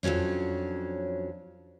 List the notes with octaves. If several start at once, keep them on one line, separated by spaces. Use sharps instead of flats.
F2 F#3 G3 C#4 D4